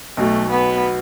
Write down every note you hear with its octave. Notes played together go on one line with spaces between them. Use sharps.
B1 B2 F#3 A3
B3